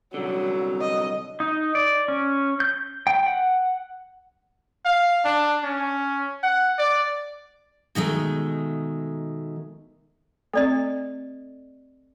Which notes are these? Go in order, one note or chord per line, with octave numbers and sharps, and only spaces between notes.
C2 D3 F#3
D#5
D#4
D5
C#4
G6
G5
F#5
F5
D4
C#4
F#5
D5
B2 D#3 G#3 A3
A3 C4 A4 D5 D#5